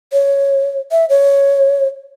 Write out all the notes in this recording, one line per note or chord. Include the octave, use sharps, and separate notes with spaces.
C#5
E5
C#5